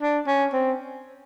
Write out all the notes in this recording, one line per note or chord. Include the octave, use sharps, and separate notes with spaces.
D4
C#4
C4